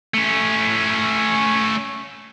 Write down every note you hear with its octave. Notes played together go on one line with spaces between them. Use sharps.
A3 C#4